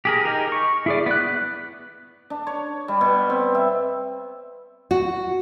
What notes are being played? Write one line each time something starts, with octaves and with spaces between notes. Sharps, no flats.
G4 G#4 A#4
D#4 G4 G#4 A#4
C#6
E4 G#4 D5
B3 F#6
D4
C#5
G3
B2
C4
E5
F#4